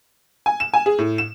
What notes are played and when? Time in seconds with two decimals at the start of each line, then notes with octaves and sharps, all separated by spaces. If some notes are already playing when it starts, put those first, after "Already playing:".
0.46 G#5
0.60 E7
0.74 G#5
0.86 G#4
0.98 A2
1.18 E7